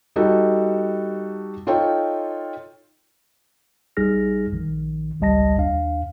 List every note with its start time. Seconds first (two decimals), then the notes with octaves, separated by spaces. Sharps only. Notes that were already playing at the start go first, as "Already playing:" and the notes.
0.16 G3 D#4 F#4 A4
1.67 D#4 F4 A4 C#5 G5
3.97 A#1 G3 D#4 G#4 F6 A#6
4.52 A#1 D#3
5.20 G#1 C#2 G3 D#5 A5 A#6
5.57 D#2 D4 F5